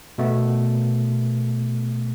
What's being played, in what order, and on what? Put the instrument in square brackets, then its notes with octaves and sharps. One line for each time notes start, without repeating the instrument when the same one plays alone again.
[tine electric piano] B2 A3 B3